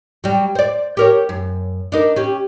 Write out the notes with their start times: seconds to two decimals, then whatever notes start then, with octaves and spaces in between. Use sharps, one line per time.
0.24 F#3 G3
0.55 C5 D5
0.97 G4 A#4 C#5
1.29 F#2
1.92 D4 D#4 A#4
2.16 C#4 G4